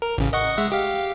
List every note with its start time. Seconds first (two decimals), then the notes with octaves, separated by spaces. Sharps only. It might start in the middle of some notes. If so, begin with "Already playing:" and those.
0.02 A#4
0.18 A1 C#3
0.33 D#5 F#5 C#6
0.58 G#3 E5 F#5
0.72 G4 F5